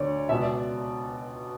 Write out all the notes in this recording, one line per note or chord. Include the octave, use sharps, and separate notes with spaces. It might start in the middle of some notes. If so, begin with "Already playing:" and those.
Already playing: D2 D3 C#5 D5
C#2 B2 E5
D5